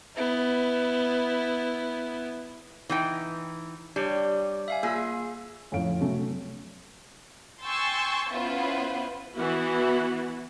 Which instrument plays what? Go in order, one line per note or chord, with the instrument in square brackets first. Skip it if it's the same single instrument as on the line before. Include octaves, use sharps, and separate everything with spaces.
[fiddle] B3 E4
[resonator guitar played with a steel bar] E3 D#4 G5
[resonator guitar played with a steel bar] G3 [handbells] D4 G4 C#5
[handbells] E5 F5 G#5
[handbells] A#3 F4 E6 [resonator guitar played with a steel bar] G#4
[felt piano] F#1 F2 A2 C#5 F5 D7
C3 F#3 A3 C#4 A4
[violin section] G5 G#5 C6 C#6 E6 A6
B3 C#4 E4 F4 B4 C5
[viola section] E3 B3 E4 F#4